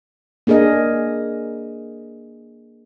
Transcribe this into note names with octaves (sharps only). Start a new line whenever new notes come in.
A#3 D4 G#4 A#4 D#5